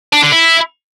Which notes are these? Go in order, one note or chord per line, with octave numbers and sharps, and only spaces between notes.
D4
D3
E4